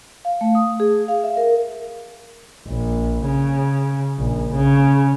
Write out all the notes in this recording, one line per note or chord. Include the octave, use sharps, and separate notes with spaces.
F5
A3
D#6
G#4
F5
E5
A#4
A#1
C#3
A#1
C#3